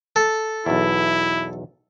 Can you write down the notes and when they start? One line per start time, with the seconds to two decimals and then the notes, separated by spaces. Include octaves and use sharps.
0.16 A4
0.66 B1 E2 E4